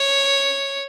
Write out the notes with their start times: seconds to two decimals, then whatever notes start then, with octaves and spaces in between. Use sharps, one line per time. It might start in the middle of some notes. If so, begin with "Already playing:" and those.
Already playing: C#5